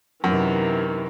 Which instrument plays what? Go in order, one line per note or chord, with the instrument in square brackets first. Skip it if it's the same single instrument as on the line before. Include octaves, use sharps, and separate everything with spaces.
[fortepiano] F#2 [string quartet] C3 D#3 E3